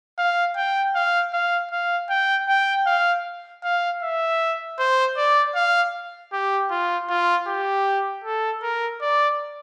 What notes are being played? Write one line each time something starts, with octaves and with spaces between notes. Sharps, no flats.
F5
G5
F5
F5
F5
G5
G5
F5
F5
E5
C5
D5
F5
G4
F4
F4
G4
A4
A#4
D5